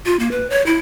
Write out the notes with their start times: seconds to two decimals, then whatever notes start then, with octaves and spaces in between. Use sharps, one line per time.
0.06 F4
0.20 A#3
0.31 B4
0.50 C#5
0.66 E4